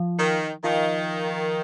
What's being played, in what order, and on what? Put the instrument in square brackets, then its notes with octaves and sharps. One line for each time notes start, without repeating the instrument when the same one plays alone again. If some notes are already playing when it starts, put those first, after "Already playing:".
Already playing: [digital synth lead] F3
[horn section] D#3
[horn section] D#3 [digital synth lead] F3